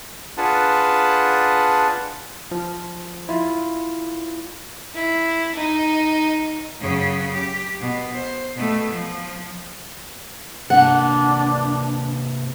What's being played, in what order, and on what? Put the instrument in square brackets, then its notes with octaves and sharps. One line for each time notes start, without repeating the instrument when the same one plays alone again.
[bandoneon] D4 F4 G#4 B4 F#5 A5
[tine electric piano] F3
E4 F4
[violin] E4
D#4
[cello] F#2 C#3
G4
B2
C5
B2 A3
F3
[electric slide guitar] C3 A#3 [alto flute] D4 [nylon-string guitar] F#5